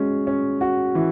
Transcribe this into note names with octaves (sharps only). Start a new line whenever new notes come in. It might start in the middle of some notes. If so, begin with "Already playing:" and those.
Already playing: G#3 C#4 F#4
C#4
F#4
E3